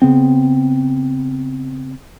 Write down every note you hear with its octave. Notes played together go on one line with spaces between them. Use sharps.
C#3 B3 C4